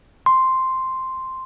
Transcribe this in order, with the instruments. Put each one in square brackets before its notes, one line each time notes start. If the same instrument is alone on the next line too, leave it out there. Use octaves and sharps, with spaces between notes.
[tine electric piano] C6